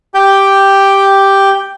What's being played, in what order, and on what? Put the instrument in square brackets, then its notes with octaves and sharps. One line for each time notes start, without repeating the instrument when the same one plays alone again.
[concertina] G4 G5